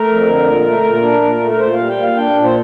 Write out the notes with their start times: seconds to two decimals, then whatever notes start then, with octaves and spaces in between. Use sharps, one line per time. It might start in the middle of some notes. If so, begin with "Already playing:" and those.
Already playing: A3 A#4
0.08 F2
0.26 D3
0.45 A#2
0.65 A3
0.83 A#2
1.02 D4
1.22 A#2
1.40 A3
1.51 A#4
1.60 A#2 C5
1.73 F5
1.79 G3
1.89 G5
1.97 A#2
2.02 F5
2.16 D4 G5
2.36 A#2
2.44 C5